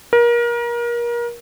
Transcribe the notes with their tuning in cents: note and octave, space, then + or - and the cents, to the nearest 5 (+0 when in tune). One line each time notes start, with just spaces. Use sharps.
A#4 +30